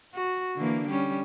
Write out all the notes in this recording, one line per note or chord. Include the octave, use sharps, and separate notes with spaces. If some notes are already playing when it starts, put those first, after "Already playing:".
F#4
D3 E3 A#3
G3 C#4